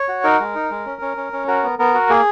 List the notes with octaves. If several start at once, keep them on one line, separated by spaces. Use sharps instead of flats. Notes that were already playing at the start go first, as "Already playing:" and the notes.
Already playing: C#5
F#4
D#4 A#4
G#3
D#4
G#3
C#4
C#4
C#4
C#4
F#4 A#4
B3
B3 A#4
F#4
A#3 G#4